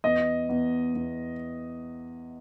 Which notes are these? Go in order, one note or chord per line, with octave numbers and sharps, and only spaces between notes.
E2 D#5
E2
E2